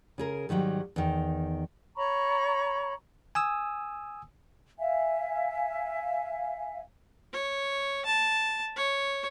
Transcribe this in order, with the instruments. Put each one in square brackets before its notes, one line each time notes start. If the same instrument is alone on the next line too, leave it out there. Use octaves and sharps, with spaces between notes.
[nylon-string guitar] C#3 G#4 A#4
G#2 D#3 F#3 G3
E2 D#3
[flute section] C#5 A#5 B5 C#6
[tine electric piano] G#5 D#6 E6
[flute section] E5 F5 G#5
[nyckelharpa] C#5
A5
C#5